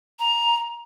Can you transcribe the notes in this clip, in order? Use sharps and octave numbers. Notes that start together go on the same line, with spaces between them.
A#5